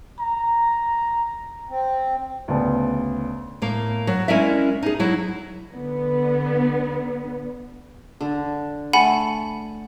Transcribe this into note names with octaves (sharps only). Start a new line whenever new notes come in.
A#5
C4
D2 C#3 B3 D5 A5
A2 A#3
F#3
G#3 C#4 E4 A#4 D5 E5
D#4 G#4
F#3 E4
D3 B3
D3
A3 F#5 G#5 B5